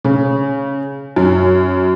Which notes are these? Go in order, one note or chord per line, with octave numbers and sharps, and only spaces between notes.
C#3
F#2